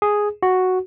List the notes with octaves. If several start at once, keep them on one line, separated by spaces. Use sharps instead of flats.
G#4
F#4